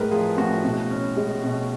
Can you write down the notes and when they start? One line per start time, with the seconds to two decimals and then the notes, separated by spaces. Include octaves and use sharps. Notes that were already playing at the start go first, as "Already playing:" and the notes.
Already playing: A2 G#3 A#4 B4
0.11 F3 G#4
0.38 A2 F#4
0.64 B2
0.91 C#4
1.17 G#3
1.44 B2